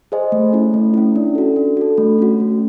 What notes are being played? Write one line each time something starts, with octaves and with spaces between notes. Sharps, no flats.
G#4 C5 D#5 G#5
A3
C#4 E4
A3
C#4 E4
D4
F#4 A4
D4
F#4 A4
A3
C#4 F#4
A3